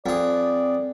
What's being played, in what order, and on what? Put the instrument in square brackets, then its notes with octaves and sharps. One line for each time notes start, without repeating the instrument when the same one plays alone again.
[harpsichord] F2 G#4 [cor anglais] D5